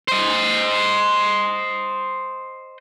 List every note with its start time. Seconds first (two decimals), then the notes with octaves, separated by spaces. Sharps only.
0.08 C5 D#5